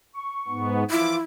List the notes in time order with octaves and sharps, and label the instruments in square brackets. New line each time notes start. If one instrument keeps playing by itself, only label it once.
[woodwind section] C#6
[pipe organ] G#2 B3
[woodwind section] E3 F3 F4 [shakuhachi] E4 [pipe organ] D6